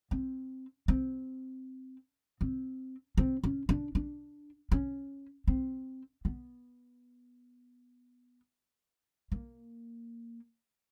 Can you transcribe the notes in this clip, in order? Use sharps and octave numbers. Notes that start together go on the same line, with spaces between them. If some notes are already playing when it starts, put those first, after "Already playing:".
C4
C4
C4
C4
C#4
D4
D4
C#4
C4
B3
A#3